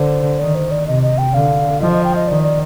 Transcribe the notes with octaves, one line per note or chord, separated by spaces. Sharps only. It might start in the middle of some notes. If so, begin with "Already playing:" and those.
Already playing: D3 C5
D#3 D5
C5
D5
C3 D#5
D#5
G5
D3 F5
F3 D#5
D#5
G5
D#5
D#3 D5
D5